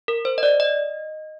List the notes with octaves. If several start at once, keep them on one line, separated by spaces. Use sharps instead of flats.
A#4
C5
D#5
D5
D#5